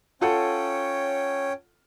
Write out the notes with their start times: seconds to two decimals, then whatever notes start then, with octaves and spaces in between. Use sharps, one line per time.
0.21 C#4 F4 A4 C#5 F#5 G5